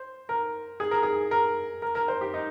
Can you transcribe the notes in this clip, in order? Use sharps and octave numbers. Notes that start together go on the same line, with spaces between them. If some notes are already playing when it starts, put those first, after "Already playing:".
Already playing: C5
A#4
G#4
A#4
G#4
A#4
A#4
A#4
C5
G4
D#4